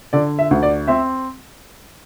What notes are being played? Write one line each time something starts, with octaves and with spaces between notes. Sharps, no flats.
D3 D5
E5
D2
D5
C4 E5